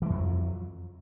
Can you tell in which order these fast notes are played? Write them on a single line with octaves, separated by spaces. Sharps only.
E3 G#3 F2 F#3